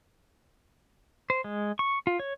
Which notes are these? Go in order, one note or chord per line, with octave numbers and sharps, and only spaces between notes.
C5
G#3
C#6
F4
C#5